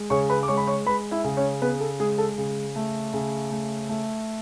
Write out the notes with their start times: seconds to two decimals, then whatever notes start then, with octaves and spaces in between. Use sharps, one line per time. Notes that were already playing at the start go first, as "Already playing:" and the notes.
Already playing: G#3
0.10 C#3 C#5 C#6
0.30 B4 B5
0.43 D6
0.48 G#3 C#5 C#6
0.57 B5
0.67 C#5 C#6
0.86 G#3 B4 B5
1.11 E4 E5
1.24 C#3
1.37 C#4 C#5
1.62 C#3 B3 B4
1.80 A4
2.00 G#3 G#4
2.18 A4
2.38 C#3
2.76 A3
3.14 C#3
3.51 A3
3.89 A3